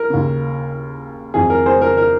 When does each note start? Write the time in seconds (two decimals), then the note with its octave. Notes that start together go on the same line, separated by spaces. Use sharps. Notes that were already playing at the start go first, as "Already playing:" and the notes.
Already playing: A#4
0.10 D#2 C#3
1.34 F2 D#3 G#4
1.50 A#4
1.66 G#4 C5
1.82 A#4
1.97 A#4